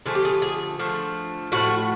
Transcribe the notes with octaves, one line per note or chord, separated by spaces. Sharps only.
D3 F3 A3 G#4
G4
G#4
G#4
D3 F3 A3
A2 F3 A3 F#4